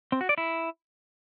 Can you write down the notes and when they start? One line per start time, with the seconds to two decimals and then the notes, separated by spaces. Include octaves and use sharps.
0.12 C4
0.21 F#4
0.29 D5
0.38 E4